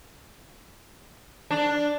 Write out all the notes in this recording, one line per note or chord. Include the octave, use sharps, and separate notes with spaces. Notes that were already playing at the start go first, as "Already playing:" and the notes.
D4